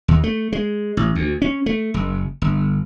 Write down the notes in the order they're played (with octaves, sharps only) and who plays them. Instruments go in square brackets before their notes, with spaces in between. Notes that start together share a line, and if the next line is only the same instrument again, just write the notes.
[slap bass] D#2
A3
G#3
A1
D2
C#4
A3
F#1
G1